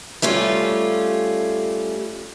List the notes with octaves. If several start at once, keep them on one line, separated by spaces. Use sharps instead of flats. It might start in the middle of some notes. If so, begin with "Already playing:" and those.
G3 A3 C#4 F4